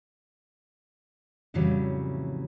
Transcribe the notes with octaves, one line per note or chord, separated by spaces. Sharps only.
F2 A2 C#3 E3 F#3 G3